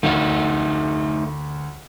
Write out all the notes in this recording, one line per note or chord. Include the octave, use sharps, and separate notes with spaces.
D2 A3 D#4 F5